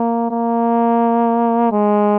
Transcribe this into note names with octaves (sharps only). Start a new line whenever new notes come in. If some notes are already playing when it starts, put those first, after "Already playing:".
Already playing: A#3
A#3
G#3